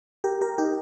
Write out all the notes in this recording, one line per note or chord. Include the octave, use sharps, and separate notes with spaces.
G4 A#4
G4 A#4
D#4 G4